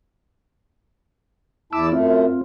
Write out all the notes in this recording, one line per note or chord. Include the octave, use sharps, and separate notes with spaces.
E2 E4 A5 B5 D6 E6
F#2 A3 C4 F4